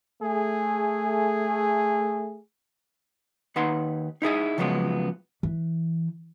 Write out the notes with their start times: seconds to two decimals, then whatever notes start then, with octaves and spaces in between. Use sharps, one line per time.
0.21 A3 G#4
3.56 D#2 D#4 B4 F#5 C6
4.22 D#4 E4 G#4 D#5
4.58 C#3 F3 F#3 G#3 B3
5.43 E3